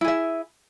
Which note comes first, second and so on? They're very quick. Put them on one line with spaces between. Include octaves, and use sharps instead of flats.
E4 G#4 E5